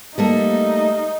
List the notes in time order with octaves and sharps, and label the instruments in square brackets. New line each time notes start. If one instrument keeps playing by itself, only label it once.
[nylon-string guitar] G3 A3 A#3 [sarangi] D#4